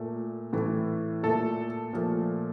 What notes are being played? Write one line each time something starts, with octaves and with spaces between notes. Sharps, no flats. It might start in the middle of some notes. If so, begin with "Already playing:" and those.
Already playing: A#2 A3
A2 E3 A3
A#2 A3 A4
A#2 F3 A3